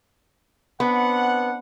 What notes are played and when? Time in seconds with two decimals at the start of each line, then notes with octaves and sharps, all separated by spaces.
0.80 B3 C4 D4 F#5